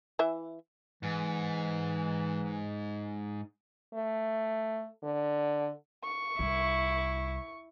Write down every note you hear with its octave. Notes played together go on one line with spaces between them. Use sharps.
E3 E4 E5
G#2 E3
A3
D3
C#6
C2 E4